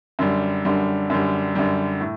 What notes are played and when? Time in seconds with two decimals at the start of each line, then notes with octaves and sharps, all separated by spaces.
0.19 F#2 D3 G3
0.65 F#2 D3 G3
1.10 F#2 D3 G3
1.55 F#2 D3 G3
2.00 A2